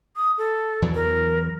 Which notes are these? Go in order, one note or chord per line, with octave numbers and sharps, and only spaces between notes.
D#6
A4
E2 E3 F#3
A#4